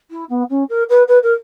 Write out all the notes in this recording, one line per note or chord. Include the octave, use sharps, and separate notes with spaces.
E4
B3
C#4
A#4
B4
B4
A#4